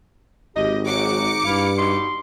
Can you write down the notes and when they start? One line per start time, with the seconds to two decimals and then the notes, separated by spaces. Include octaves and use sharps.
0.56 G#1 G4 D#5
0.86 F#3 G#3 D#4 F#4 D6 C#7
1.45 G2 E4 F5
1.78 B2 D#4 C6